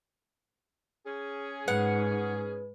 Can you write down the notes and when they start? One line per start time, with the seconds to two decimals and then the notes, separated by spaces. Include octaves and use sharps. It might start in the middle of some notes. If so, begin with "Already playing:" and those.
1.06 C#4 G#4
1.68 G#2 B4 F#5